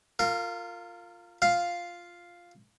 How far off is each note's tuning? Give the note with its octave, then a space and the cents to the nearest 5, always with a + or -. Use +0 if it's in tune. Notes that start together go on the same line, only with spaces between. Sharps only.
F4 +0 A#4 -30
F4 +0 F5 +0